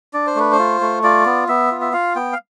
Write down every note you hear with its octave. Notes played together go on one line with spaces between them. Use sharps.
D4 D5
C5
A3 B4
C5
F4
A3
F4 D5
B3
B3 E5
F4
E5
F4 F5
B3 G5
F5